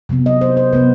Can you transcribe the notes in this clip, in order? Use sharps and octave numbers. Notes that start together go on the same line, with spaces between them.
C3 F#3 B3
D#5
C5
C5
C3 F#3 B3 B4